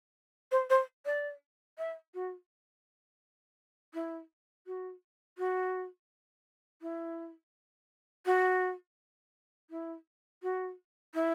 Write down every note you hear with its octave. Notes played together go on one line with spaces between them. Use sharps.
C5
C5
D5
E5
F#4
E4
F#4
F#4
E4
F#4
E4
F#4
E4